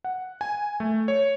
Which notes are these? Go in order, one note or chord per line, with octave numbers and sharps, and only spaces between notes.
F#5
G#5
A3
C#5